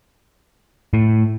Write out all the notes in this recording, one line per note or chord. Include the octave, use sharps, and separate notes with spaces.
A2